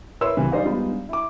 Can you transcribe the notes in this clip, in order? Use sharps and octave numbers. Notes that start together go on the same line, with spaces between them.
E4 A#4 B4 C#5 C6 E6
C#2 C3 E3
G3 D#4 C5 D5 D#5 F5
G3 G#3 B3 D#4 F4
D4
E4 D6